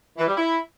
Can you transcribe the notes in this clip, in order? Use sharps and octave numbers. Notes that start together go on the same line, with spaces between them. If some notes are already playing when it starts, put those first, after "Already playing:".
E3
G3
E4